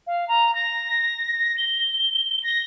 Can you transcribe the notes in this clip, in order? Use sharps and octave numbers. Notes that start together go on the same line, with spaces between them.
F5
A#5
A#6
G7
A#6